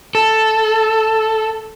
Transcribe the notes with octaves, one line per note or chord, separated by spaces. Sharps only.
A4